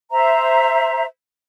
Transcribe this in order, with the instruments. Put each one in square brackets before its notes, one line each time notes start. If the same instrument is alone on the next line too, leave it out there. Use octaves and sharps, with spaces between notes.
[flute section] C5 E5 A#5